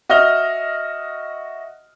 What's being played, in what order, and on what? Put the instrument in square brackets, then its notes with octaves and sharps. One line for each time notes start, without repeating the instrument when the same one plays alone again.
[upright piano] F#4 D#5 E5 F6 G7